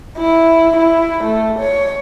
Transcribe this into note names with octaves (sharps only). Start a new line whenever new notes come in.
E4
E4
A3
C#5